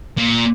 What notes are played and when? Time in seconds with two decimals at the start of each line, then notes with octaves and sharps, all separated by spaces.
0.18 A#2